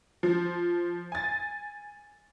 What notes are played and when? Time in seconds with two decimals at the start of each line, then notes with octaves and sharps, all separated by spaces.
0.23 F3
1.12 G#5 A6